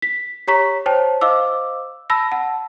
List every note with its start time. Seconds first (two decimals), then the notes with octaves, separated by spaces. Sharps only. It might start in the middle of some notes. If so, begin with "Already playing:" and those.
0.02 B6
0.48 G4 C#5 A#5 C#6 B6
0.86 C5 C#5 G5 A5
1.21 C5 D#5 F5 D6 E6
2.10 A5 B5 E6 A#6
2.32 F#5 A5